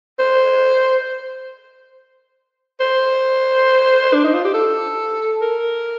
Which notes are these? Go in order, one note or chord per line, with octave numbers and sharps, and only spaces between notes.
C5
C5
D4
D#4
F4
G4
A4
A#4